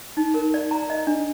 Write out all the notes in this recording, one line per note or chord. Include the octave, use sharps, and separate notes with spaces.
D#4
A#4
D5
A#5
D#5
D4